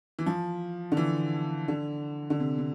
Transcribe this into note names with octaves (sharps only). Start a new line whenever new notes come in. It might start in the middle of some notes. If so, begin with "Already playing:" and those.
E3
F3
D3
E3
D3
D3
C3
C3